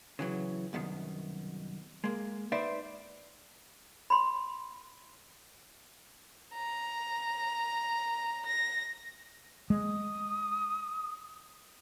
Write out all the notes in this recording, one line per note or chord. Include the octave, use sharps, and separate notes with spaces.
C#3 E3 F#3
C2 F#2 B2 D#3
G#3 A#3
D#4 B4 C5 D5 E5
B5 C6
A#5
A#6
G#3 D#6